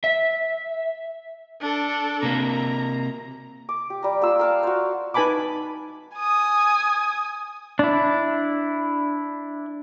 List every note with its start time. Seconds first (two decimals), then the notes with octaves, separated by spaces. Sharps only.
0.04 E5
1.61 D4 A4
2.23 C3 A#3 A#5
3.69 D6
3.90 G4
4.02 G3 A#5
4.21 A#3 F4 E6
4.39 A#4 F5 A5
4.63 F#4 C5
5.14 D#4 B4 G#5 A5 B5 D6
6.16 G#5 D#6
7.79 D4 E4